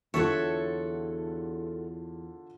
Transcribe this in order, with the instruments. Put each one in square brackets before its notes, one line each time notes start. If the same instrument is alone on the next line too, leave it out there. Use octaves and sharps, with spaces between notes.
[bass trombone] E2 [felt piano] D3 D4 F4 [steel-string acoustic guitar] F#4 A4 E5 [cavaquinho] C#5